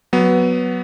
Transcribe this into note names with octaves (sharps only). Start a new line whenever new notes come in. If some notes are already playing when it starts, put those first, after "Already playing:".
F#3 B3